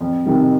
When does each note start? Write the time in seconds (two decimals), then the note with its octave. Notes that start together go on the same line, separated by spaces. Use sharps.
0.01 F2
0.26 C3 D#3 G3